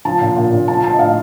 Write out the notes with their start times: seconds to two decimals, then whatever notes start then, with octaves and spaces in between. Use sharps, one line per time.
0.05 F3 A5
0.21 A#2
0.36 A#2
0.52 A#2
0.68 F3 A5
0.83 F3 A5
0.93 D#5
0.99 A2 F5